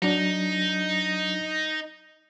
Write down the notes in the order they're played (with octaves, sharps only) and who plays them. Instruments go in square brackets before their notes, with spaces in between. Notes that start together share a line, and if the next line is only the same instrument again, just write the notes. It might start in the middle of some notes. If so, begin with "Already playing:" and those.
[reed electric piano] F#3 D4 [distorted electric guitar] D#4